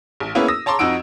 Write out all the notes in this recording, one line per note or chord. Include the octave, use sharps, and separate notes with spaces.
A1
A#3 B3 C#4 E4 G#4 B4
D#6 E6 A#6
C#5 A5 A#5 C6 D6
F2 D#4 F#4 E6 D7